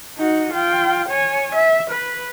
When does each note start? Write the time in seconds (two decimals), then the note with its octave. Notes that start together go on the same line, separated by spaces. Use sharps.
0.17 D#4 F#4
0.53 F4 G5
1.09 C#5 G#5
1.55 E5
1.90 B4